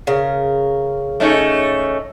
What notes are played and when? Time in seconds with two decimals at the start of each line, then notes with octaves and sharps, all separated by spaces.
0.07 C#3 A#4
1.20 A3 C#4 D#4